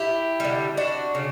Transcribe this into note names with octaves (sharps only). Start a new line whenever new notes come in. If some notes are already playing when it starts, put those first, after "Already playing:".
Already playing: E4 G4
D3 G3
D4 F#4
C#3